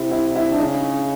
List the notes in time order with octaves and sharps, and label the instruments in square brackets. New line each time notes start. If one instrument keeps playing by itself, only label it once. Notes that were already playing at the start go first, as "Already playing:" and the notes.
Already playing: [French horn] C3 [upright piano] E4
[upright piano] E4
E4
D4
[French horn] C#3 [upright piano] D#4